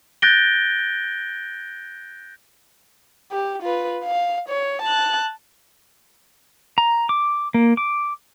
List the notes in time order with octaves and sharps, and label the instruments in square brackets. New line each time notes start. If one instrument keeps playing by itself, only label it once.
[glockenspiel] F#6 G6 A6 A#6 D7 G7
[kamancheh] G4
F4 B4
F5
C#5
A5 F#6
[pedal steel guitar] A#5
D6
A#3
D6